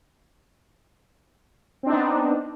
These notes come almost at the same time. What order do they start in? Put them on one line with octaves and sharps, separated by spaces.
C4 D4 D#4 B3